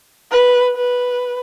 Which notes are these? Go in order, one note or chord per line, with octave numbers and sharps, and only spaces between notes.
B4
B4